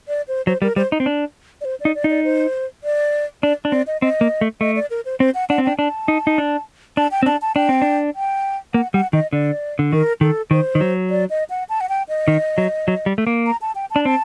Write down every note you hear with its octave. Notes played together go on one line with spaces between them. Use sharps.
D5
C5
F#3 C5
G3 A#4
G3 C5
D#4
C4
D4
D5
C5
D#4 D5
D5
D#4
D5
C5
D5
D4 D5
D4
C4 D5
D#5
C4 D#5
A#3
A3
A3 D#5
D5
A#4
C5
C4 C5
F#5
D4 F#5
C4
D4 G5
D4 A5
D#4
D#4
D4
D4 A5
G5
C4
D4 A5
A5
D4 G5
C4
D4
G5
A#3 F#5
G3 F#5
D#3 D#5
D3 D5
D3
D#3 A#4
D#3 A4
D#3 C5
D#3
F#3
D5
D#5
F#5
A5
F#5
G5
D#5
D#3
F#3
F#3
G3
A3
A#3
A#5
A5
G5
A5
D4
C4 A5